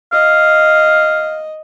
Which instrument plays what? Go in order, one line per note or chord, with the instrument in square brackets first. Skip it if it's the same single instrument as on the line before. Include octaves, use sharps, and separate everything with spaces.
[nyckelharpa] D#5 [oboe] F5